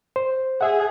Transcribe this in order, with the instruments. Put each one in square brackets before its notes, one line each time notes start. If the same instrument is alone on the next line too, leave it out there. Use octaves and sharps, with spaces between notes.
[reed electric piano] C5
[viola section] G#4 [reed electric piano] E5 F#5